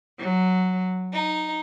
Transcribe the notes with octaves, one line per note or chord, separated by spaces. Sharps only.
F#3
D#4